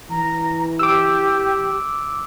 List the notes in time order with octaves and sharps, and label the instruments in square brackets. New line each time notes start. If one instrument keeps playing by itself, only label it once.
[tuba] E3 [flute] A#5
[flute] G4 [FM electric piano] D6 E6